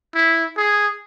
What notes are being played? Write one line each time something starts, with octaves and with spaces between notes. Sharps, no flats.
E4
G#4